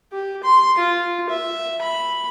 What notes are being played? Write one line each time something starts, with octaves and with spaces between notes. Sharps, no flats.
G4
C6
F4
E5
B5